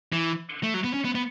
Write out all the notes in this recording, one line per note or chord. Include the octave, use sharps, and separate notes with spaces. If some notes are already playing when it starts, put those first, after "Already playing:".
E3
A3
F#3
B3
C#4
B3
B3